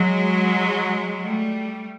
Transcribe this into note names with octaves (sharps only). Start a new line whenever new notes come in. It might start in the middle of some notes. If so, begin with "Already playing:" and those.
Already playing: F#3 G#3
G3 A3